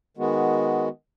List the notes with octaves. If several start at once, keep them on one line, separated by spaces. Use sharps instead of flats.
D#3 G#3 B3 F#4